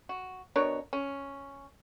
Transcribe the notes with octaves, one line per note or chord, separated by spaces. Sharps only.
F#4
B2 D4 A#4 C#5
C#4